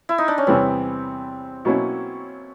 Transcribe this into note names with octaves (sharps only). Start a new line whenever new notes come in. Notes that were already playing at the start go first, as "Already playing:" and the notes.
E4
D#4
D4
C#4
E2 C3 E3 G3 B3 C4
B2 F#3 A#3 C#4 E4